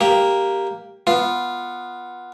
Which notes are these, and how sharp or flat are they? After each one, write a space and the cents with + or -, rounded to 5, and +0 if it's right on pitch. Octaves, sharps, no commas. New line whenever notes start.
A#3 +0 G4 +0
B3 -10 F4 -5